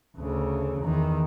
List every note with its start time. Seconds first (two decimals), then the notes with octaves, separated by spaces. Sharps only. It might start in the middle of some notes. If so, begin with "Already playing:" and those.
0.17 D2 C#3
0.80 E2 D#3